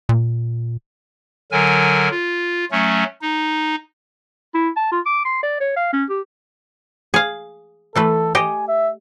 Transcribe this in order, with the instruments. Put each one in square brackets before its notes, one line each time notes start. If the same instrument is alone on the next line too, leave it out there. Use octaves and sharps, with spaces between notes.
[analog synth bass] A#2
[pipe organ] D3 F#3 A#4 G#5
F4
F#3 A3 C#4
D#4
[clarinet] E4
A5
F4
D6
C6
D5
C#5
F5
C#4
G4
[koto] G#4 F5
[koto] E3 A3 B4 [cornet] A4
[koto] G4 D#5 [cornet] G#5
[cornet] E5